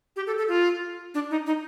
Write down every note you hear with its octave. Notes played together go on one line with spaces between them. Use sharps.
G4
A4
A4
F4
D4
D#4
D#4